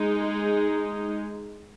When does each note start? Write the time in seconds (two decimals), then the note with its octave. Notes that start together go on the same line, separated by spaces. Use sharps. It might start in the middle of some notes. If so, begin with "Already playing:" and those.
Already playing: G#3 D#4
0.19 G#4